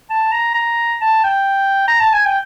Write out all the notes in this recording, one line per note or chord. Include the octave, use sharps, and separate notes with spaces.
A5
A#5
A#5
A5
G5
A#5
A5
G#5
G5